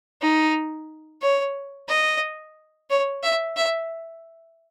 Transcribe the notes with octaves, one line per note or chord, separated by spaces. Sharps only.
D#4
C#5
D#5
C#5
E5
E5